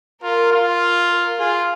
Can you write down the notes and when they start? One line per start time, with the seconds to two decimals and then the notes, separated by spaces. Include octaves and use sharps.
0.23 F4 A#4
0.52 F4
1.09 A#4
1.39 F4 G#4